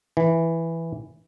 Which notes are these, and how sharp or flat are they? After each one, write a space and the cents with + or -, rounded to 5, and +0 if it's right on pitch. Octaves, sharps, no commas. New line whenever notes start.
E3 +0